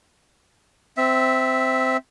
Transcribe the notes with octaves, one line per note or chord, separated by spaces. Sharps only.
C4 E5